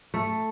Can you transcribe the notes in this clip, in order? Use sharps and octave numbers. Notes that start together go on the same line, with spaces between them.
A3